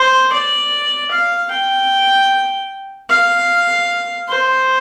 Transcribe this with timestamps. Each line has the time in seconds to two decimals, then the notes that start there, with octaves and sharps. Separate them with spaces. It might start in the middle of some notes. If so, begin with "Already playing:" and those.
Already playing: C5
0.33 D5
1.11 F5
1.51 G5
3.10 F5
4.29 C5